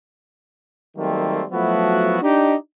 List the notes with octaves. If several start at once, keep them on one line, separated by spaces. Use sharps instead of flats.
D#3 F#3 G3 A3 A#3 C4
F3 F#3 A3 B3 E4 F#4
D4 D#4 G4